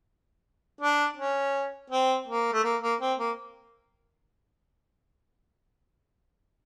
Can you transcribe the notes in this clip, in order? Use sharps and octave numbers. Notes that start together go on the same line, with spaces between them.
D4
C#4
C4
A#3
A3
A#3
A#3
C4
A#3